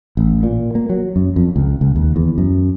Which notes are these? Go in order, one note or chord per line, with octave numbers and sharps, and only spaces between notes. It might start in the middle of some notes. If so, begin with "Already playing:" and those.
A1
A#2
A#3
F#3
F#2
F2
C#2
C#2
D#2
E2
F#2